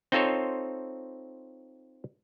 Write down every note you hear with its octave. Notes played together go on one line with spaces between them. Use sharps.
C4 D#4 F4 A4 C5 C#5